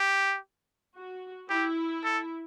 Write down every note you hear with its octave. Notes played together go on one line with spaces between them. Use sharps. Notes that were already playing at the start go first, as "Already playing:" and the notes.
Already playing: G4
F#4
E4 G4
A4